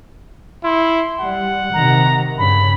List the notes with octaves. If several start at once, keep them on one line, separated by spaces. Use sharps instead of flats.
E4 C6
G3 F#5
C3 D#3 A#5
G2 C#3 B5